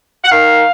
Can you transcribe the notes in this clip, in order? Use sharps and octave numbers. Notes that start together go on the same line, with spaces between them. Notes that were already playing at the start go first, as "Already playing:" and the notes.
F#5
D#3 F5